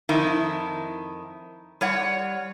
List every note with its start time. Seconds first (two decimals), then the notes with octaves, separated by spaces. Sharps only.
0.09 F2 D#3 E4
1.81 G3 C#5 F#5